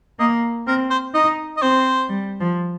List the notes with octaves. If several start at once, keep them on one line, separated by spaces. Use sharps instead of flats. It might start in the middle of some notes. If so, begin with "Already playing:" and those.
A#3 D#5
C4 A#4
C5
D#4 D#5
D#5
C4 C5
G3
F3